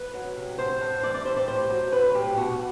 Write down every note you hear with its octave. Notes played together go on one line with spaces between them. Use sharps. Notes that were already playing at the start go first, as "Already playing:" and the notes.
Already playing: B4
F#3
C3
A2 C5
A2
E3 D5
D5
G3 C5
D5
A2 C5
F#3
F#3 B4
A2 G4
B2 F#4